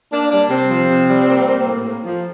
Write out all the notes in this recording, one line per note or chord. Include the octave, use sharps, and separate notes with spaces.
A#3 D4
G3 D4
C3 C4
F3
C3
G3
A#3
A#3
A2
A2
F3